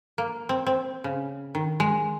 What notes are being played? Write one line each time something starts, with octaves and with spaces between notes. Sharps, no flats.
A#3
C4
C4
C#3
D#3
G#3